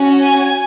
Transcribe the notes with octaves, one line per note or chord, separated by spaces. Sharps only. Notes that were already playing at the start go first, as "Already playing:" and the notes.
Already playing: C#4 F#4
G#5